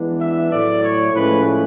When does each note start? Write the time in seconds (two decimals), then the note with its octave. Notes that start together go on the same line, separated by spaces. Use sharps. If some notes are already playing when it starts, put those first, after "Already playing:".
Already playing: E3 G#3 B3 D4
0.20 E5
0.51 A2 F#3 A3 D5
0.82 C#5
1.13 A2 F3 G#3 C#4 B4